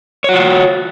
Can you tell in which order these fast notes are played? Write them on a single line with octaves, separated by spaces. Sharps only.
C#5 F#4 F4